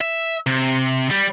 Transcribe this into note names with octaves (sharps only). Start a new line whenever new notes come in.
E5
C3
G3